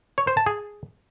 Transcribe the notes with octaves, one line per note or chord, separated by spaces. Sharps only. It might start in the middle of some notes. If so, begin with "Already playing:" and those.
C#5
C5
A5
G#4